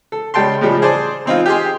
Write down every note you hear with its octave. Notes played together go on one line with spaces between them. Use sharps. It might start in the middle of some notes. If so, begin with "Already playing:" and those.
A4
C#3 G3 G#3 G5 A5 C6
A2 C#3 F3 G3 G#3
G#4 C5 D5 A5
E3 C4 D#4 F4
G4 G#4 C6